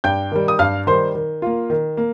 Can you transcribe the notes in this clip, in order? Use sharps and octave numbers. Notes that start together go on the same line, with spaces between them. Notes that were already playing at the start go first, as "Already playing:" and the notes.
G2 G5 G6
D#3 G3
D#6
G2 F5 F6
D#3 G3 C5 C6
D#3
A#3 F4
D#3
A#3